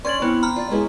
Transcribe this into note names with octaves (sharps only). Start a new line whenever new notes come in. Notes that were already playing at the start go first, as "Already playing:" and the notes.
C#4 D4 D5 C6 G#6 F#7
B3 C4 E4
A#5 B5 F6
F4 D5
F#3 G#3 B3 E4